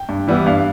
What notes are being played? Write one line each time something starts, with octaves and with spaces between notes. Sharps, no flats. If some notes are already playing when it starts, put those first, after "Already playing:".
Already playing: G5
G2
E3 G3 B3 E4
G2 F5